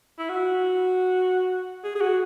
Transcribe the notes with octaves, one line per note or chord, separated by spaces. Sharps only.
E4
F#4
G#4
G#4
F#4